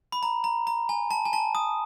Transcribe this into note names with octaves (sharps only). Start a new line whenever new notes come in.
B5
A#5
A#5
A#5
G#5
A5
G#5
A5
D#6